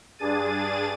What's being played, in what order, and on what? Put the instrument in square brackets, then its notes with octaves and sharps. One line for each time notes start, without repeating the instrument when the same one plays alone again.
[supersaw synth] G2 D4 G#4 A6 D#7